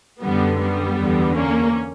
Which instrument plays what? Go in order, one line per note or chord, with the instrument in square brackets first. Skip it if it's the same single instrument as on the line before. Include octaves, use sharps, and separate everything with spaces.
[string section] F#2 D3 G3 B3
G3 B3
E2 D3
A#3 C#4